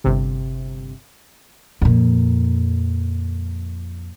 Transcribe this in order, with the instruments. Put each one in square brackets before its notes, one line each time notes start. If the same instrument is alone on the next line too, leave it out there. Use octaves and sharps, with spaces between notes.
[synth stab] G1 C3
[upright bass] F2 A#2